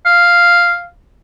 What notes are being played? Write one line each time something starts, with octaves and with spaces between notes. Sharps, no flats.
F5